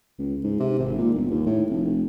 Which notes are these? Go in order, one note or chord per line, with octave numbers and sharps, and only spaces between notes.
C#2
G#2
C3
G#1
A#2
G1
D#2
A2
F1